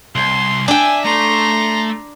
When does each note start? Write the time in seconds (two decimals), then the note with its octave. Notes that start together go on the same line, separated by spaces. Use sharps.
0.15 C2 C6
0.68 D4 E5 G5 G#5
1.05 A3 A#5 C6